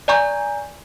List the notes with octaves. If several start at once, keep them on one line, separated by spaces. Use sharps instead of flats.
D5 D#5 G#5 A#5 C#6 G6